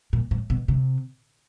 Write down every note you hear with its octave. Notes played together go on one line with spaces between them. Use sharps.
A#2
A2
B2
C3